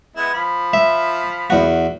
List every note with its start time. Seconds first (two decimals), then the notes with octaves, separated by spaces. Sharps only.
0.16 G#3 B3 E4
0.34 F3 B5
0.73 E5
1.50 E2 F#4